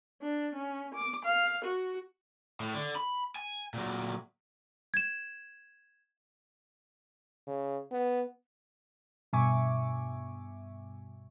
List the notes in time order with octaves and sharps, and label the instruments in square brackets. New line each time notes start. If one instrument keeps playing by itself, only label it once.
[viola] D4
C#4
D6
F5
F#4
[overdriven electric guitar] A2
D3
B5
G#5
A#2 F#3
[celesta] G#6 E7
[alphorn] C#3
B3
[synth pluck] G2 B2 E5 G#5 C#6 D6